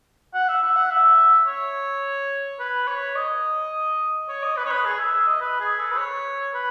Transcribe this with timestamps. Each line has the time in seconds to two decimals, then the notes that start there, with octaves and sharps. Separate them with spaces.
0.34 F#5
0.49 E5
0.63 E5
0.76 F#5
0.91 E5
1.47 C#5
2.59 B4
2.87 C#5
3.16 D#5
4.29 C#5
4.43 D#5
4.57 B4
4.65 C#5
4.71 B4
4.85 G#4
4.99 E5
5.13 E5
5.27 D#5
5.41 B4
5.60 G#4
5.79 A4
5.91 B4
5.97 C#5
6.54 B4